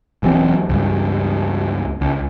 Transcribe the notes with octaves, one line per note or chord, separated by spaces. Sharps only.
E1 E3 F#3 C4
C#2 G2
C#2